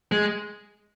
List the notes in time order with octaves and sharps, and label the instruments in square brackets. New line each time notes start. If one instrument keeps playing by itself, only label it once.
[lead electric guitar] G#3